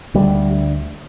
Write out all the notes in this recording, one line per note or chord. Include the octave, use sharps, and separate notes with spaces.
D2 G3